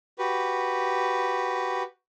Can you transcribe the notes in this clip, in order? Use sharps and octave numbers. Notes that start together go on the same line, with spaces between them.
F#4 G4 B4